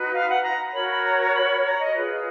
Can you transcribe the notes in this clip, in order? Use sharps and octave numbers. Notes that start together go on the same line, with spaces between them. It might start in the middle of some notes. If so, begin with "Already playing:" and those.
Already playing: D#4 F#4 B4
F5
F#5
A#5
F#4 A#4 C#5 B5
B5
A#5
A#5
B5
B5
A#5
D#5
F4 G#4 B4